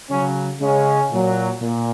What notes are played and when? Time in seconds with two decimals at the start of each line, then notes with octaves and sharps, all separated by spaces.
0.10 C#3 F#3 C#4
0.60 C#3 G#3 C#4
1.11 A#2 F#3
1.61 A#2